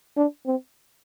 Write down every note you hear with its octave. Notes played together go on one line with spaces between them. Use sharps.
D4
C4